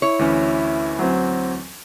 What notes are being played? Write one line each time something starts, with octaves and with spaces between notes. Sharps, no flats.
E4 C#5
D2 E3 C#4
F#3 C4